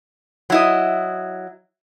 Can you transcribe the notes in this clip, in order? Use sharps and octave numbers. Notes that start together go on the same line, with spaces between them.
F#3 E4 D#5